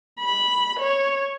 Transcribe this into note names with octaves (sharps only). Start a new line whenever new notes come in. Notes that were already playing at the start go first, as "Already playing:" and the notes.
B5
C#5